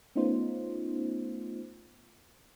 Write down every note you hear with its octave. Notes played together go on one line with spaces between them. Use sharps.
A3 B3 C#4 D#4 F4 C5